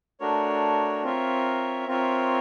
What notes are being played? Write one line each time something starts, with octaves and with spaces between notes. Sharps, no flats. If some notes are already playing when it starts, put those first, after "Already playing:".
A3 D4 F#4 A#4 C#5
C4 F4 A#4 C#5 E5
C4 F4 A#4 C#5 E5